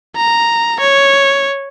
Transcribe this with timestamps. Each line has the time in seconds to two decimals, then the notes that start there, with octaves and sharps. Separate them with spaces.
0.16 A#5
0.80 C#5